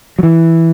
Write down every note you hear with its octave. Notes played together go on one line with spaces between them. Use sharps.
F#3
E3